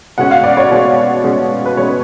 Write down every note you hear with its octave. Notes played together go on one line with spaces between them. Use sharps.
B2 G#3 C#4 F#5
F5
D5
C#5
B2 G#3 C#4
B2 G#3 C#4
B4
B2 G#3 C#4 C#5